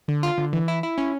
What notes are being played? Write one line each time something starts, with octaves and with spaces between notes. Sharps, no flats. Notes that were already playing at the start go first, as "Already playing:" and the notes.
D3
F4
D3
E3
E4
E4
C#4